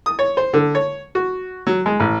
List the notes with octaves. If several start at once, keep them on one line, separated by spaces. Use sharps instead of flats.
D#6
C#5
C5
D3
C#5
F#4
F#3
G#3
A1